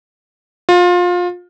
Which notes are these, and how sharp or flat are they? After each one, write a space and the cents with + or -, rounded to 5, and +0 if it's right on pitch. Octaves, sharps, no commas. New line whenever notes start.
F4 +25